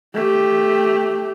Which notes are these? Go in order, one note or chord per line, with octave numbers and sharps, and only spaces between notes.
A3 G4